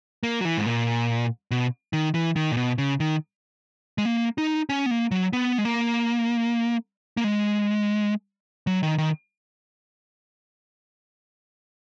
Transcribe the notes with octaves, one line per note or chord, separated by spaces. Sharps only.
A#3
F#3
E3
G#2
A#2
B2
D#3
E3
D#3
A#2
B2
C#3
D#3
G#3
A#3
D#4
C#4
B3
A#3
F#3
B3
G#3
A#3
A#3
G#3
F#3
D#3
D#3